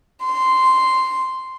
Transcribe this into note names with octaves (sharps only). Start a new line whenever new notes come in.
C6